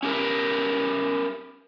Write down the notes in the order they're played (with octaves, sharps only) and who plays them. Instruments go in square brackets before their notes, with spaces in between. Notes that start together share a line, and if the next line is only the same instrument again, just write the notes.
[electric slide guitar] C#4 G4 A#4 B4